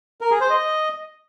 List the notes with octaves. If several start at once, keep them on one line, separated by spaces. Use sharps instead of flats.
A#4
G#4
C5
D#5